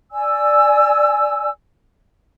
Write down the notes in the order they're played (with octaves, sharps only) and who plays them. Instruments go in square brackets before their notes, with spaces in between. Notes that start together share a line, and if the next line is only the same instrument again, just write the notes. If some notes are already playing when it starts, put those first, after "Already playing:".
[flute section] D5 G#5 E6